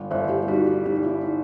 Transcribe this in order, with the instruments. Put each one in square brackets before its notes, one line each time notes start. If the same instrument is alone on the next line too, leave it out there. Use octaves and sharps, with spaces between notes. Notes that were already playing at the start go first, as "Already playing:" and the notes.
Already playing: [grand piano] G1
[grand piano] G1 [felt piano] C5 E5
[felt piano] E4 G4
E4
[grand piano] G3 [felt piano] D#4 F#4
[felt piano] E4
[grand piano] G3 [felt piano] D#4
[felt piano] E4
D#4